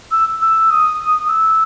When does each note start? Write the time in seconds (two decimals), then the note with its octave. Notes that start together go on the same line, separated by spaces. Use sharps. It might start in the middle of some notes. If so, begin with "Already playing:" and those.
0.11 E6
0.41 E6
0.70 D#6
1.28 E6